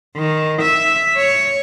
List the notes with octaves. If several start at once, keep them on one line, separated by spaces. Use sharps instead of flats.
D#3
E5
C#5